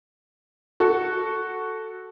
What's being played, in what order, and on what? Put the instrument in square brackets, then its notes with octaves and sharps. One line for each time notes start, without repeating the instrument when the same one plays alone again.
[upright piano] F#4 A4